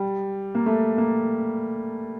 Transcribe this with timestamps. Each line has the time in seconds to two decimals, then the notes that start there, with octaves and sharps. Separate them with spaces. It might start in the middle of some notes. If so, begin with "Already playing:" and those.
Already playing: G3
0.55 A#3
0.66 A3
0.98 A#3